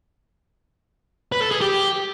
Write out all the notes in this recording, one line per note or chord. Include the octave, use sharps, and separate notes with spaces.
B4
A4
G#4
G4